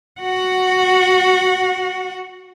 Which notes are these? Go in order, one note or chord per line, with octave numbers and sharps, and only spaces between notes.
F#4 F#5